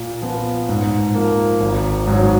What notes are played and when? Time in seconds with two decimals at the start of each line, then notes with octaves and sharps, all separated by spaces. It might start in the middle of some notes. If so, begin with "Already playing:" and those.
Already playing: A#2
0.22 F3 B3
0.69 G#2
1.14 F3 A#3
1.60 G#1
2.07 G#2 F#3